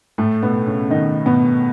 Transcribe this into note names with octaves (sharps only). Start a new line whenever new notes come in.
A2 A3
B2 B3
C#3 C#4
D#3 D#4
B2 B3